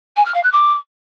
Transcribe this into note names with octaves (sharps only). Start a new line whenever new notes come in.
G#5
F6
F5
F#6
D6